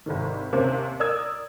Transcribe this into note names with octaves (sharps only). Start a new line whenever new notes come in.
G#1 C3 D#3
D#2 C3 A#3 C4 C#4
A#4 D5 D#6 E6 G#6